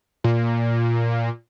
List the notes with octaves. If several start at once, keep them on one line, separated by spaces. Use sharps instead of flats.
A#2